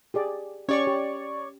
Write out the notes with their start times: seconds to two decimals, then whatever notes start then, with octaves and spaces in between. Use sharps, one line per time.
0.14 G4 G#4 D5
0.69 C#4 G4 C#5 D5 C#6
0.87 G4